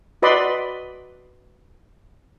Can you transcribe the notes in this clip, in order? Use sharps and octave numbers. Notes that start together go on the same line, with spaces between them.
F#4 B4 D5 D#5 B5 C6